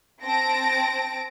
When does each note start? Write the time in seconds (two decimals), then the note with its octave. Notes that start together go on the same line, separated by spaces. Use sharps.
0.23 C4 A5 A#6 D7